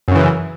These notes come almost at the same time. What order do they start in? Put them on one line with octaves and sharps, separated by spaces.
F#2 C#3 E3